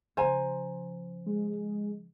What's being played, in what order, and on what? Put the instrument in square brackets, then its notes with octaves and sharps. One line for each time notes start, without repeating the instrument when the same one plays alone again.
[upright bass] C#3 F3 [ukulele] C5 G#5 A#5
[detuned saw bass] G#3